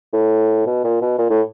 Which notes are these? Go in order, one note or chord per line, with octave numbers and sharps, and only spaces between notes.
A2
B2
A#2
B2
A#2
A2